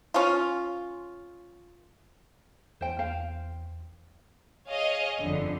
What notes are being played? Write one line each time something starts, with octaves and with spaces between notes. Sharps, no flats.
C#4 F4
E2 C5 G5
C5 F5 G5
G#4 C#5 D#5 F5
G1 F2 D3